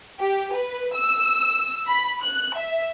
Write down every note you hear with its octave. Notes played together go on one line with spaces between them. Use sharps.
G4
B4
E6
B5
F#6
E5